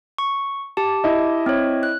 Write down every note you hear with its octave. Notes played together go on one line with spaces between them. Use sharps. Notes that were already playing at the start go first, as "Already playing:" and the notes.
C#6
G4 A5
E4 D#5
C4 C#5
F#6